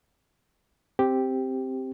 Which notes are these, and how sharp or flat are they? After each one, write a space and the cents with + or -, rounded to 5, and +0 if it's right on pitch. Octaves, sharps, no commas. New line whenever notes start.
C4 +0 G4 +0